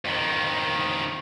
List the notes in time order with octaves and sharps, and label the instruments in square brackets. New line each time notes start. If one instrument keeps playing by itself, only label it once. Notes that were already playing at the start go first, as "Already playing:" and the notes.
[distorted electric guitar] F2 D#3